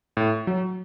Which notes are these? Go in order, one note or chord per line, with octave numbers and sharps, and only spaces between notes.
A2
F#3